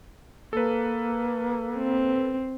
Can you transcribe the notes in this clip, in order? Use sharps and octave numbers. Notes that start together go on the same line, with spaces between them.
A#3 A4 B4
C4